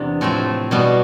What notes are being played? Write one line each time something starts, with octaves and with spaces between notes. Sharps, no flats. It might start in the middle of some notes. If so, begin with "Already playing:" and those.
Already playing: E2 C3 B3 D4 G4
A2 F3 A3 C4
B2 G3 B3